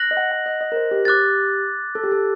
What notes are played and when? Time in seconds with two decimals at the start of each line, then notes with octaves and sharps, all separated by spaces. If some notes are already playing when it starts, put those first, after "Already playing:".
Already playing: F#6 A#6 F#7
0.11 D#5
0.17 F#5
0.31 F#5
0.46 D#5
0.61 D#5
0.72 A#4
0.76 C5
0.91 G4
1.05 G4 D6 F#6 A6
1.95 A4
2.03 G4
2.12 A4